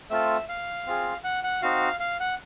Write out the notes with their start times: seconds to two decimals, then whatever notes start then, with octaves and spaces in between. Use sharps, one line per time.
0.10 A3 C4 F4 A4 E5
0.49 F5
0.87 C4 F4 G#4
1.24 F#5
1.44 F#5
1.62 C4 D#4 F#4 F5
2.00 F5
2.20 F#5